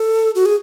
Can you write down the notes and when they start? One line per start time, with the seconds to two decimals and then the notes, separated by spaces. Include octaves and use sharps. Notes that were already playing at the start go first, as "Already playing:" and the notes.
Already playing: A4
0.35 F#4
0.45 G#4